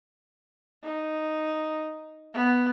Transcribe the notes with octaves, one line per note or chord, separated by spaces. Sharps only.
D#4
B3